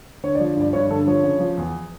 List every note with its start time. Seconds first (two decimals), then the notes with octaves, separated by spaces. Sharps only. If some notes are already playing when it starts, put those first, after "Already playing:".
0.24 D3 C#5
0.35 D5
0.40 F3
0.56 G2 D5
0.73 G2 C#5
0.90 D3 A4
1.07 F3 C#5
1.23 C#3
1.40 F3
1.58 E2